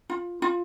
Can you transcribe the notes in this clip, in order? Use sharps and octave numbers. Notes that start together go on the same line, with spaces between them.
F4
F4